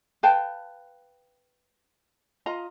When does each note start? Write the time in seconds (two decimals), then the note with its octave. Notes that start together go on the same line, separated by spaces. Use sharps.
0.23 B4 F5 G5 A5
2.46 F4 D#5 A#5